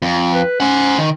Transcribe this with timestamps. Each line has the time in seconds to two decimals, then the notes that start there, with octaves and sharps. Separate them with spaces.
0.02 F2
0.34 B4
0.60 C#4 C5 F#5
0.98 D#3